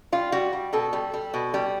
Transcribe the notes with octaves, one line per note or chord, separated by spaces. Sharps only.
G3 F4
G3 F#4
G3
B2 A4
G3
G3
B2
G3